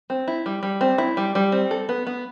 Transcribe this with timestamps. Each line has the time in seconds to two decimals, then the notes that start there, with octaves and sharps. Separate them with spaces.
0.10 C4
0.28 E4
0.46 G3
0.63 G3
0.81 C4
0.98 E4
1.17 G3
1.35 G3
1.52 C4
1.71 A4
1.89 B3
2.07 B3